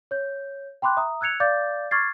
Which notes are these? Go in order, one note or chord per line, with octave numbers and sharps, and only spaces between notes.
C#5 G6
G5 B5 C6 D6 F#6
E5 A#5 D#6
E6 F#6 G#6 C#7 F7
D5 F5 D6 G6 A6
C#6 D6 F6 G#6 A6 C7